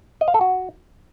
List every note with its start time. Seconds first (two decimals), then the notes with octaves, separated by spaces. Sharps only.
0.21 D#5
0.28 F5
0.34 A4
0.41 F#4